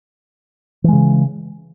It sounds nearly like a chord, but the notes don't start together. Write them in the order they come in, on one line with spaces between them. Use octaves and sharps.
E3 G#3 C#3